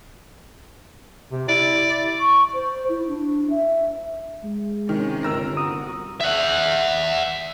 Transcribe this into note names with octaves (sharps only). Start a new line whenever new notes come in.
C3
E4 D5
C#6
C5
E4
D4
E5
G#3
C3 D#3 C#4
G1 A#4 E6 A#6
F#4 D#6
E5 F#5